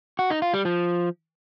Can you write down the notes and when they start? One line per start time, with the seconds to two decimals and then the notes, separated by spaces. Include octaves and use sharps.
0.19 F#4
0.30 D#4
0.42 F4
0.54 G3
0.65 F3